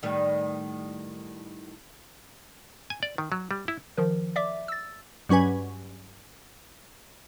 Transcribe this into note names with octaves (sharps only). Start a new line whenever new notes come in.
A2 D#3 G3
G#5
D5
D#3
F#3
G3
E4
D#3 F3 A#4
D5 E5 D6
E6 A6
G2 F#3 C#4 B4 G#5